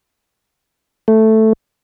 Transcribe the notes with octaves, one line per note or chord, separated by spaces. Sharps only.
A3